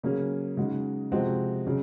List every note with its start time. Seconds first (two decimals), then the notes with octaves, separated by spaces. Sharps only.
0.03 C#3 F#3 A#3 C#4 G#4
0.57 C#3 G#3 D#4 F#4
1.11 C3 F3 G#3 C4 F#4
1.67 C#3 F#3